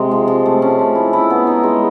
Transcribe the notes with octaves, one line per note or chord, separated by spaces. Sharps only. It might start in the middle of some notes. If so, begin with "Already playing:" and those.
Already playing: C3 G#3
F3
F3
A3
C#4
A3
E4
E4
B3
D#4
G#3